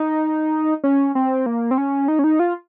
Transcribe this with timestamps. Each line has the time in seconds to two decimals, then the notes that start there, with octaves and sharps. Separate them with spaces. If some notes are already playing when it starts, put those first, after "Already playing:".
Already playing: D#4
0.84 C#4
1.15 C4
1.46 A#3
1.71 C4
1.78 C#4
2.08 D#4
2.19 C#4
2.24 D#4
2.39 F4